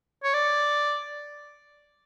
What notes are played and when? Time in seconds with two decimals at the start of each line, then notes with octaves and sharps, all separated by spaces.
0.24 C#5
0.34 D5